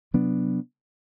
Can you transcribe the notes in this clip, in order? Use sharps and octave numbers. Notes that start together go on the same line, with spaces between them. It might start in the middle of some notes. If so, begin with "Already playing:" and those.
C3 F#3 B3 D4